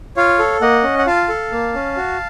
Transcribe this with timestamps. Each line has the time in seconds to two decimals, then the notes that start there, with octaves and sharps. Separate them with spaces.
0.16 F4 C#5 F5
0.39 A4
0.61 A#3 D#5 F#5
0.84 C#4
0.99 F#5
1.06 F4 F5 A5
1.29 A4
1.52 A#3
1.74 C#4
1.97 F#4